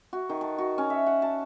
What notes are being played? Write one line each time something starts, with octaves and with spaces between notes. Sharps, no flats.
F#4
D#3
A5
F#4
C#4
E5
F#5
A5